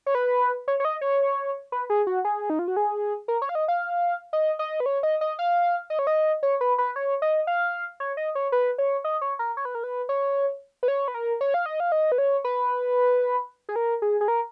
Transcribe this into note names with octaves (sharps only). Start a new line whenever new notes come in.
C#5
B4
C#5
C#5
D#5
C#5
B4
G#4
F#4
G#4
D#4
F4
F#4
G#4
A#4
C#5
F5
D#5
F5
D#5
D#5
B4
C#5
D#5
D#5
F5
D#5
C#5
D#5
C#5
B4
B4
C#5
D#5
F5
C#5
D#5
C#5
B4
C#5
D#5
C#5
A#4
C#5
B4
A#4
B4
C#5
B4
C#5
B4
A#4
C#5
F5
D#5
F5
D#5
B4
C#5
B4
G#4
A#4
G#4
G#4
A#4